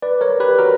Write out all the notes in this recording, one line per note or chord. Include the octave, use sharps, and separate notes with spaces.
B4 D5
A#4 C#5
G4 B4
F#4 A#4